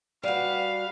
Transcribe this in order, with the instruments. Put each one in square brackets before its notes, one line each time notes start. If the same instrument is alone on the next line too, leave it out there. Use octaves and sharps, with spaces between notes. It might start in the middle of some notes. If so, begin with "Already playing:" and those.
[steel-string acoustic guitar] G3 F#4 [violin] B4 F5